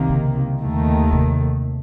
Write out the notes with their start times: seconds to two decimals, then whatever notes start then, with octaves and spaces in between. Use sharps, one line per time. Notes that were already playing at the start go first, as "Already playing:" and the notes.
Already playing: C2 C3 D#3 A#3
0.09 C#3
0.61 D#2 D#3 A3
1.12 C3